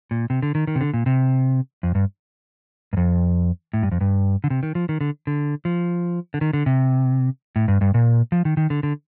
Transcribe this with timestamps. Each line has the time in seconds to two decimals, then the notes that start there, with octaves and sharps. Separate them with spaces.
0.11 A#2
0.30 C3
0.42 D3
0.55 D#3
0.67 D#3
0.76 C3
0.81 D3
0.94 A#2
1.06 C3
1.83 F2
1.95 G2
2.93 G2
2.97 F2
3.73 A2
3.83 G2
3.92 F2
4.01 G2
4.44 D3
4.50 C3
4.63 D#3
4.75 F3
4.89 D#3
5.01 D3
5.27 D3
5.65 F3
6.34 D3
6.41 D#3
6.53 D3
6.66 C3
7.56 A2
7.68 G2
7.81 G2
7.94 A#2
8.32 F3
8.45 D#3
8.57 D#3
8.70 D3
8.83 D3